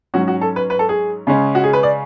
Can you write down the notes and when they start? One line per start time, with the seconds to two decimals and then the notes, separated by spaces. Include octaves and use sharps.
0.14 G#2 F#3 C#4 F#4
0.28 F#4
0.41 A4
0.56 B4
0.70 B4
0.79 A4
0.89 G#4
1.27 C#3 G#3 C#4
1.55 F#4
1.64 G#4
1.73 B4
1.83 D5